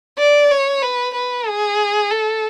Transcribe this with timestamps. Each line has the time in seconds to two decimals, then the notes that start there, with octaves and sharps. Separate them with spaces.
0.19 D5
0.51 C#5
0.83 B4
1.15 B4
1.47 G#4
2.11 A4